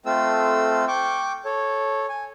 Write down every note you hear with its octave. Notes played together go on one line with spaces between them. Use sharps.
A3 C4 F4 A4 E6
G5 C#6 D6
A4 C#5
G#5